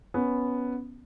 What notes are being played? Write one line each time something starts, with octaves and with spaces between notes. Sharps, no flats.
B3 C#4